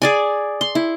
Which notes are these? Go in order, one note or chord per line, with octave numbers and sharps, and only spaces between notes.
G#4 D5 G#5
C6
E4